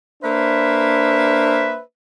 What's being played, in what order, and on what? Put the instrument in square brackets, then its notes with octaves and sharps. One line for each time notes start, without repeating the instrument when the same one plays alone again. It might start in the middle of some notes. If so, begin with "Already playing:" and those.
[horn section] A#3 D4 B4 C5 E5